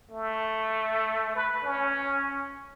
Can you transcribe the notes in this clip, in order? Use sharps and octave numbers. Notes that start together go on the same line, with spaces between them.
A3
B4
C#4